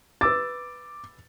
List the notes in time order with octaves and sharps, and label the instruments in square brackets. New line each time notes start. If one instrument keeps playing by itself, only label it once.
[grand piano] B4 E6 A6 [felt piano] D6